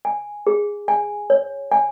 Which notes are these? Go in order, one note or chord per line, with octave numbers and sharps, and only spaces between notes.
G#5
G#4
G#5
C#5
G#5